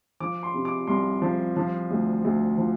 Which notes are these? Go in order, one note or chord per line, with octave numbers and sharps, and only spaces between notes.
F3 D6
C6
C3
D6
C2 C6
F3
F3
D2
D2
F3